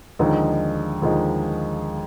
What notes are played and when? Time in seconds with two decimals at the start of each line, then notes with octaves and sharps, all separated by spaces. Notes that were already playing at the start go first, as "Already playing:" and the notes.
0.19 D#2 D3 F3 G#3 D#4
1.02 D#2 D3 F3 G#3 D#4